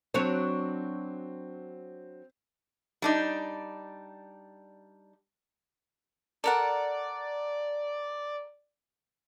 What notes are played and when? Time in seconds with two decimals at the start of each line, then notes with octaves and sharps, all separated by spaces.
0.14 F#3 C4 D4 C#5
3.02 G3 D4 D#4
6.44 A4 A#4 D5 F#5